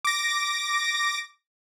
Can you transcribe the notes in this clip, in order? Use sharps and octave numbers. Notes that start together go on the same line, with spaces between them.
D6 A#6